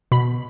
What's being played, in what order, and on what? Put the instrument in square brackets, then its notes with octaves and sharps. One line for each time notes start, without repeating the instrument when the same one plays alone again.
[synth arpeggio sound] B2 B5